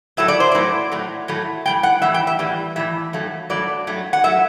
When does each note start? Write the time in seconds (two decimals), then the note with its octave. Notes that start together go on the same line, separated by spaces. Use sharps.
0.17 A2 F#3 A3 E5
0.28 D5
0.40 C5
0.52 A2 F#3 A3 D5
0.92 A2 F#3 A3
1.28 A2 F#3 A3
1.65 A2 E3 G3 G5
1.83 F#5
2.02 A2 E3 G3 E5
2.14 G5
2.27 E5
2.39 A2 E3 G3
2.76 A2 E3 G3 E5
3.13 G2 F#3 A3
3.50 G2 F#3 A3 D5
3.87 G2 F#3 A3
4.13 F#5
4.24 G2 F#3 A3 E5